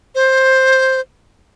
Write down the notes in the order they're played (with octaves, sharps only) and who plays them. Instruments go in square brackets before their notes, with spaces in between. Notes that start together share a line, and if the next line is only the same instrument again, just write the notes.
[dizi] C5